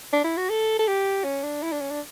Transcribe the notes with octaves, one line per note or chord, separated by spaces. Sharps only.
D4
E4
F#4
A4
A4
G4
C#4
D4
E4
D4
C#4
D4